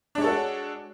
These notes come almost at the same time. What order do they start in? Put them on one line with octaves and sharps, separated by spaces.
D4 G#3 C#5 A4 F#4